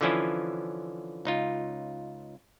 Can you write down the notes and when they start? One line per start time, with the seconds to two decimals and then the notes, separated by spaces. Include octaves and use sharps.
0.01 D3 E3 F3 C#4 E4 F4
1.25 C#2 D#4 F4